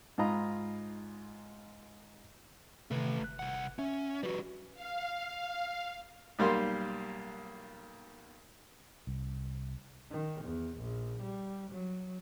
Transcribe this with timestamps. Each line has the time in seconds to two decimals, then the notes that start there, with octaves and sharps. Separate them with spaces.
0.18 G#2 D#4 F4 D#5 A#5 B5
2.91 C3 D#3 A3 B4
3.20 G1 F#6
3.39 C2 F#5
3.79 C#4 E5
4.23 G3 F#4 B4
4.74 F5
6.39 B1 G3 A#3 C6
9.07 C2
10.11 D#3
10.45 E2
10.78 A#1
11.22 G3
11.71 F#3